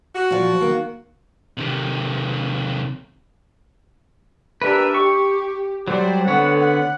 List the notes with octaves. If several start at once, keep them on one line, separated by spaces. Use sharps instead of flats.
F#4
A#2 F3
D#3 A#3
C3 D#3
D4 G4 A#4 B4 E5
G4 C#6
F#3 G3 C5 D5
D3 A3 B3 C4 C#5 F#5
F#5